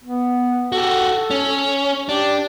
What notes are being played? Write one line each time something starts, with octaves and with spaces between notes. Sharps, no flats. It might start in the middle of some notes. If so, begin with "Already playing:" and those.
B3
F#4 G4 A4
C#4
D4 G4